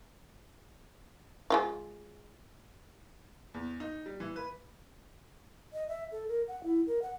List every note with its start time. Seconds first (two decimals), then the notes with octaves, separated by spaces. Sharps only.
1.50 G#3 F4 F5
3.54 E2
3.80 D#4
4.06 G3
4.20 E3
4.36 B4
5.73 D#5
5.89 E5
6.12 A4
6.28 A#4
6.48 F#5
6.64 E4
6.87 A#4
7.02 F#5